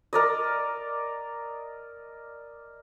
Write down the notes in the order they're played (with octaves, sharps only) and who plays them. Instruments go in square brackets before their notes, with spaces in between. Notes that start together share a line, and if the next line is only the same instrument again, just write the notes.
[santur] A#4 D5 D#5